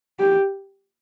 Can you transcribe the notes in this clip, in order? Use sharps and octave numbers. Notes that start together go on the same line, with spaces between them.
G4